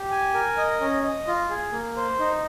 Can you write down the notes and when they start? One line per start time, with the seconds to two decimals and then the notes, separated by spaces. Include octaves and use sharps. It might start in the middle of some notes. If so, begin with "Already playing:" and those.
Already playing: G4
0.11 G#5
0.34 A#4
0.57 D#5
0.81 C#4
1.03 D#5
1.27 F4
1.50 G#4
1.73 A#3
1.96 C5
2.19 D#4